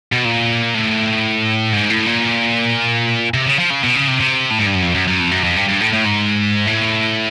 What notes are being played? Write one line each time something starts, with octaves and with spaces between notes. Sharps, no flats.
B2
A#2
A2
G#2
A2
A#2
C3
C#3
F3
C#3
B2
C#3
C3
C3
A2
G#2
G2
F#2
F2
F#2
F#2
F2
F#2
F2
G2
G2
A2
A2
G#2
A2